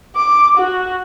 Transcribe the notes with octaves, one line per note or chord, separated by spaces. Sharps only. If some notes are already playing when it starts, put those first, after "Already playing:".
D6
F#4